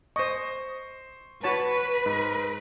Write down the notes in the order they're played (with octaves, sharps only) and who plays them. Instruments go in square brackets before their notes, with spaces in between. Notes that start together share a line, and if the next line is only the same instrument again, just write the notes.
[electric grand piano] C5 C#6 [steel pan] D#5
[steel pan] F#4 C#5 A5 [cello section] B4
[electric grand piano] G#2